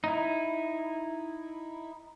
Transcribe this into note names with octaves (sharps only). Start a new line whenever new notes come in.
D#4 E4